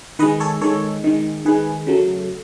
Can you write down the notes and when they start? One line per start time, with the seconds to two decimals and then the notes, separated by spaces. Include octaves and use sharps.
0.19 D#3 G#3 B4 D#5
0.40 A4 C#5
0.61 D#3 G#3 A4 C#5
1.04 D#3 G#3
1.45 D#3 G#3 G#4 B4
1.87 C#3 F#3 A3